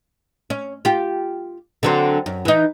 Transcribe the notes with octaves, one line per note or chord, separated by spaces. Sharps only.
C#4
F4 G4
D3 F#3 C4
F#2
E3 D#4